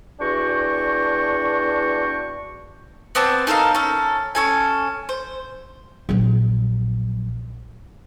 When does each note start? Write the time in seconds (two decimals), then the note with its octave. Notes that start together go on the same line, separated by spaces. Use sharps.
0.20 E2 D4 F#4 G5 C#6
3.15 B3 C4 D5 A5
3.47 D#4 A4 A#4 F5
3.75 C#4 A4
4.35 C#4 A4 G#5
5.09 C5
6.09 A#1 F#3